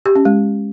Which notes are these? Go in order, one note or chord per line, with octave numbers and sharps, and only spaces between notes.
G4
C#4
G#3